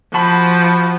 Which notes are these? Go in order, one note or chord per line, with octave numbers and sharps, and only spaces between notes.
F3 F#4 A5 B5